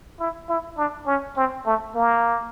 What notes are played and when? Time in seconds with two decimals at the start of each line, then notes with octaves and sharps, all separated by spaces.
0.20 E4
0.49 E4
0.77 D4
1.07 C#4
1.37 C4
1.66 A3
1.95 A#3